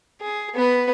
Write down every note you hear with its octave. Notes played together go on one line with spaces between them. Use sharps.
G#4
B3 B4